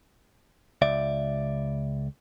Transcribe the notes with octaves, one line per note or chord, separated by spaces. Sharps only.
C#2 D5 E5